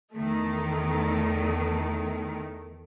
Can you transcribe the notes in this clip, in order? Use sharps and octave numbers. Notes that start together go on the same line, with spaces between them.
E2 D#3 A3